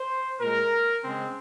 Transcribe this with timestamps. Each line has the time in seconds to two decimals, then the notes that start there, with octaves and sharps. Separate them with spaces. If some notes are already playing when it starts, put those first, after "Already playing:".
Already playing: C5
0.40 A#2 G#3 A#4
1.03 C#3 G#3 C4